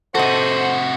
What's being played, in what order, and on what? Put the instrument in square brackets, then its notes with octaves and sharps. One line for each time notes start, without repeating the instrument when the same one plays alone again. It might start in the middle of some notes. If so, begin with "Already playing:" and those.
[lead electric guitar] C3 F#4 [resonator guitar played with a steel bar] A4 D#5 [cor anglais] C5 [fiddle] F#5